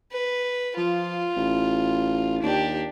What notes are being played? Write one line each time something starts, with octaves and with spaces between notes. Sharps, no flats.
B4
F3 F4
A1
D#2 D4 G4